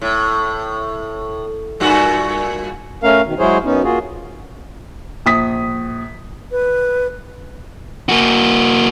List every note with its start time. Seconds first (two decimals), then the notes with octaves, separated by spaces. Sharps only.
0.01 A2
1.80 G2 A#2 F#4
3.03 A3 C#4 A#4 F5
3.25 B2 D#3
3.39 F#3 G#3 E4 G#4 C5 C#5
3.64 F#2 B3 C#4 D#4
3.84 A#3 F4 F#4 G#4
5.26 A#1 D#6 B6
6.51 B4
8.09 A#3 F#4